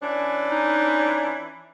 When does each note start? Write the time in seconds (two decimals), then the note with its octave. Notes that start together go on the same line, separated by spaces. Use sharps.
0.01 E3 C#4 D4
0.50 D#4